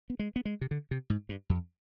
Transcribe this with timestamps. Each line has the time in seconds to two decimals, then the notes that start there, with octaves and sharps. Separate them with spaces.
0.10 B3
0.19 G#3
0.36 B3
0.45 G#3
0.61 C3
0.71 D3
0.91 C3
1.10 G#2
1.29 G2
1.50 F2